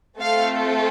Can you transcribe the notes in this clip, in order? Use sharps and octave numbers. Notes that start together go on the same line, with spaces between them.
A3 C4 F4 A4 F5